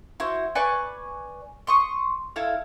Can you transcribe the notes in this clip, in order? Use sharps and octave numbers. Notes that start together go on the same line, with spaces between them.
E4 F#4 C5
B4 D5 G#5 C#6
C6 C#6 D#6
E4 A4 F5